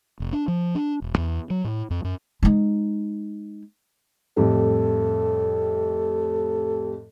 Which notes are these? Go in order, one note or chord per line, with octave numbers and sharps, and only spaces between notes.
F1
D4
F3
D4
E1
E2
F#3
A2
F2
F#2
G#3 D#4
F2 A2 G3 A4